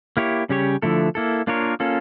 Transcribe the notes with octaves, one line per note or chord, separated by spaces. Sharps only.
A#3 E4 G4 C#5
C#3 G3 C#4 G4 C#5
D3 F3 A3 E4 A4
A#3 E4 A4
A#3 D4 F4 A#4 C#5
A#3 C#4 F4 A4